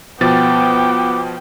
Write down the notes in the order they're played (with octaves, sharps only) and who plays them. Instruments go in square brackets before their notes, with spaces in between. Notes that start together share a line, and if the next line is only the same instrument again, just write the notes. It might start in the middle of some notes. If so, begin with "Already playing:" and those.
[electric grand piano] B2 F3 A6 [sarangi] B3 [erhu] G5 [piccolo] D6